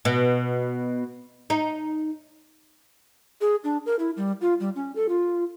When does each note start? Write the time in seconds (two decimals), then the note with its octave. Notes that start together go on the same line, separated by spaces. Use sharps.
0.05 B2
1.50 D#4
3.41 G#4
3.64 D4
3.86 A#4
3.99 E4
4.17 G3
4.41 F4
4.60 G3
4.76 C#4
4.96 A4
5.09 F4